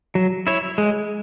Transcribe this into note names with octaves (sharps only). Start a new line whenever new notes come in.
F#3
E4 C#5
G#3